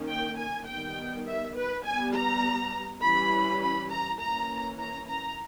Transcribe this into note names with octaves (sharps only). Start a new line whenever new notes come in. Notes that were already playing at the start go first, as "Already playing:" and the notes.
Already playing: D#3 A#3 C#4
G5
G#5
D#3 G3 B3 G5
E5
B4
G3 B3 G#5
A#5
E3 G3 C#4 B5
B5
A#5
E3 A#3 C#4 A#5
A#5
A#5